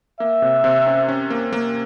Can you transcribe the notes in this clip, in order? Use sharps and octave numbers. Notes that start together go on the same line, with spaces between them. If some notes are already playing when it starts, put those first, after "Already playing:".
A#3 E5
C3
C3
C#4
C#4
A#3
A#3